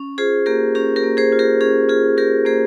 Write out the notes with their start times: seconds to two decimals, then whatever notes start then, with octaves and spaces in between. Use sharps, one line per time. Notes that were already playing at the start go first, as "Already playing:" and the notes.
Already playing: C#4
0.18 F4 G#4 C5
0.46 A#3 G4 A#4
0.75 C#4 G4 A#4
0.96 G4 A#4
1.03 A#3
1.17 G#4 C5
1.32 F4
1.39 G4 A#4
1.61 C#4 G#4
1.89 F4 G#4
2.17 F4 G4 A#4
2.45 A#3 G#4 C5